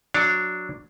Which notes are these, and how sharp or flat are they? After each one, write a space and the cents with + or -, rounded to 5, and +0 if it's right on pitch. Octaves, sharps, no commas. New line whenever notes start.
F#3 -5 D4 +0 C#5 +0